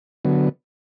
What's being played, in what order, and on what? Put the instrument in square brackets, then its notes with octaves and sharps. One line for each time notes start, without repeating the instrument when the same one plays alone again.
[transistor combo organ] D3 F#3 B3